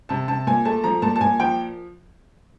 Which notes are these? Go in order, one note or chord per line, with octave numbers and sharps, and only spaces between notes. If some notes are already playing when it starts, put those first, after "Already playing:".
C3 A5
C3 A5
A#2 G#5
A3 A5
F3 A#5
A#2 A5
A5
A#2 G#5
F3 G5